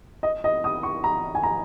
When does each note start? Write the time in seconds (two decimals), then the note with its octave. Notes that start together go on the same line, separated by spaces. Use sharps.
0.23 D#5
0.44 D#5
0.64 D#6
0.83 C#6
1.04 A#5
1.35 G#5
1.43 A#5